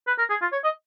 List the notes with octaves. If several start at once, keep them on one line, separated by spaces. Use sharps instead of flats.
B4
A#4
G#4
F4
C#5
D#5